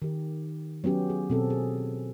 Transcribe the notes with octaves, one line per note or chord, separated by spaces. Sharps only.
D#3 G4
F#3 B3 C#4 G4
G#4
B2 C4 A4
G#4